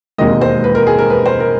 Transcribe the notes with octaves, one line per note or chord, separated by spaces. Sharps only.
E1 D#2 D#3 G#3 C4 D#5
C5
B4
A#4
G#4
A#4
B4
C5
A#4